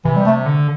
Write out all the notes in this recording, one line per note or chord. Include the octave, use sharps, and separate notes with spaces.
C3 E3
G3
A3
D3